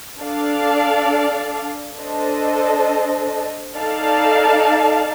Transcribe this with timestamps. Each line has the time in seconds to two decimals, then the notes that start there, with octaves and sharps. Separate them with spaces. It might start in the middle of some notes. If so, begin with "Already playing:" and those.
0.19 D4 A4 D5 F5
1.97 D4 A4 C5 D#5
3.76 D#4 A4 D5 F5 A5